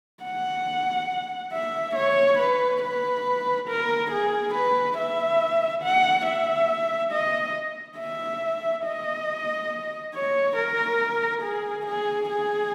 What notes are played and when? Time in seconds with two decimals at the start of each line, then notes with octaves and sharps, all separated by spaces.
0.24 F#5
1.53 E5
1.96 C#5
2.39 B4
2.83 B4
3.69 A#4
4.11 G#4
4.55 B4
4.98 E5
5.83 F#5
6.26 E5
7.12 D#5
7.99 E5
8.85 D#5
10.14 C#5
10.57 A#4
11.42 G#4
11.86 G#4
12.30 G#4